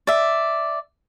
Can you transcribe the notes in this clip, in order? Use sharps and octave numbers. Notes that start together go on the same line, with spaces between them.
D5 E5